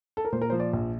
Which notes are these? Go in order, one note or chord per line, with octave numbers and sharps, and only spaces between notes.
A4
A#4
A#2 C5
A#4
F3 C5
D5
A#1